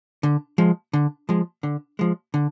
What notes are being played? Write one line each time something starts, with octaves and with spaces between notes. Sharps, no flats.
D3
F3 G#3
D3
F3 G#3
D3
F3 G#3
D3